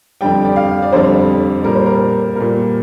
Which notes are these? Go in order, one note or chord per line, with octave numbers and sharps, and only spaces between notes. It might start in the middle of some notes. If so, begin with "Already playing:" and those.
F2 D3 G3 G5
D5
F5
D5
F2 D3 G3 C5
A#2 G3 A#4
C5
A#4
A#2 G3 A#4